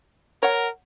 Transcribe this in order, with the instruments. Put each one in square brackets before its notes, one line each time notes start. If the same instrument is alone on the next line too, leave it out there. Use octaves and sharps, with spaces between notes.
[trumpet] A#4 [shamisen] C#5 F#5